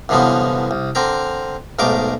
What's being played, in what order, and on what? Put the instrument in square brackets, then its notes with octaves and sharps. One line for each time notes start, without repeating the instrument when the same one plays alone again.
[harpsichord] C2 F#2 D3 E3 F3 B3
C2
D3 C4 A#4 A#5
B1 G#2 A3 A#4 D6